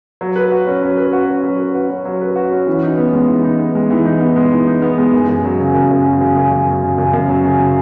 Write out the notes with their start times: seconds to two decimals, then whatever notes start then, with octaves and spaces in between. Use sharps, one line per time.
0.21 F#3
0.36 B4
0.52 F#4
0.67 C#4
0.82 F#3
0.97 B4
1.13 F#4
1.28 C#4
1.43 F#3
1.60 B4
1.75 F#4
1.90 C#4
2.05 F#3
2.21 B4
2.36 F#4
2.52 C#4
2.67 E3
2.83 D#4
2.97 B3
3.13 G#3
3.28 E3
3.44 D#4
3.59 B3
3.75 G#3
3.90 E3
4.05 D#4
4.21 B3
4.36 G#3
4.52 E3
4.67 D#4
4.82 B3
4.98 G#3
5.13 F#2
5.28 F#2
5.45 F#3
5.60 C#3
5.74 F#2
5.91 F#2
6.05 F#3
6.21 C#3
6.36 F#2
6.51 F#2
6.67 F#3
6.83 C#3
6.98 F#2
7.13 F#2
7.29 F#3
7.44 C#3